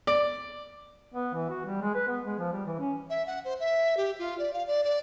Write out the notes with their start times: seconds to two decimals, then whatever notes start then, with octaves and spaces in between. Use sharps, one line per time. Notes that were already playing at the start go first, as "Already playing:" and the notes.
0.07 D5
1.14 B3
1.34 E3
1.50 F#4
1.65 G3
1.82 G#3
1.95 B4
2.08 B3
2.26 G#3
2.39 F3
2.52 G3
2.66 E3
2.79 C#4
3.10 E5
3.27 F#5
3.45 C5
3.60 E5
3.97 G4
4.19 F4
4.39 D5
4.53 F5
4.67 D5
4.84 D5